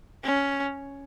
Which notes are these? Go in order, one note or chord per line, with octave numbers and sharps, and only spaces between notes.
C#4